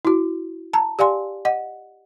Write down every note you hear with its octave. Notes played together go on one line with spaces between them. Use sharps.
E4 F#4
A5 A#5
G4 D5 F5 G#5 C6
D#5 F#5